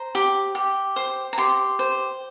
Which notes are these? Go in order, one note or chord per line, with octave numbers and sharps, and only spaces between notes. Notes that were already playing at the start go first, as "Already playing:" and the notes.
Already playing: C5 A#5
G4
G4
C5
A#5
G4 C6
C5